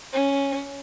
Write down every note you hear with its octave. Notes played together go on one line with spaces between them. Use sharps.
C#4